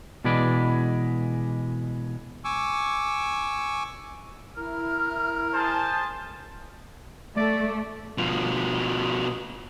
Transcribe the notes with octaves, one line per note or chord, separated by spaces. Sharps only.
B2 E3 G#3 B4 D5
G#5 C#6 D6 E6
E4 A#4 F6
G#4 C5 A5
A3 D5
B2 F3